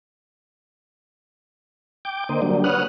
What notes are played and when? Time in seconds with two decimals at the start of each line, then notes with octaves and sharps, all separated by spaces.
2.05 G5 D6
2.29 D3 A#3 C5 D#5
2.42 D3 F#3 G3 A#3 D4
2.64 B4 C#5 F#5 D#6 F6 F#6